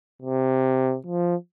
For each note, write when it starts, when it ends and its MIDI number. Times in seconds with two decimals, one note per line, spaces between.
0.22 0.96 48
1.06 1.35 53